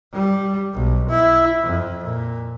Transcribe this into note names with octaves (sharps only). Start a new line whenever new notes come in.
G3
B1
E4
F2
A#2